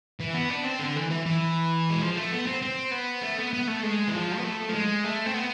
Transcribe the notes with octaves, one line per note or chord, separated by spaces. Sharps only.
E3
B3
D4
C4
D3
E3
E3
E3
G#3
F3
A3
B3
C4
C4
B3
A3
B3
B3
A3
G#3
E3
F3
B3
A3
F3
G#3
A3
C4
B3